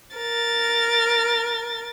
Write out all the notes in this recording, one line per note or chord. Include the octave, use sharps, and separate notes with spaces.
A#4 A6